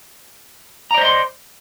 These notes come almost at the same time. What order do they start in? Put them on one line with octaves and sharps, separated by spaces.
A#5 D5 C5 D#5 C6